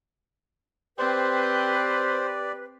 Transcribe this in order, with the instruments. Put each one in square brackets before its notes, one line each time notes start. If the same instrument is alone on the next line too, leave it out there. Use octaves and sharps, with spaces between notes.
[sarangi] C4 [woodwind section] G4 B4 [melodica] C5 [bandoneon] D5